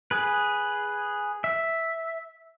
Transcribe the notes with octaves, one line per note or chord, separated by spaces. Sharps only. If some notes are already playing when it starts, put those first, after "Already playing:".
G#4 B4
E5